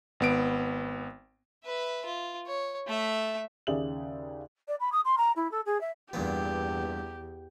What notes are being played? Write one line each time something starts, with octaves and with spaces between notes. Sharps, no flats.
G#1 B3 D7
B4 E5
F4
C#5
A3 E5
D#2 C#3 G#4 D5 E5 F#7
D5
B5
D#6
C6
A#5
E4
A4
G#4
E5
E2 G2 A#2 B3 G4